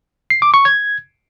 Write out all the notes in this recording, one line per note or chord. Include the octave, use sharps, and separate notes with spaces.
C7
D6
C#6
G#6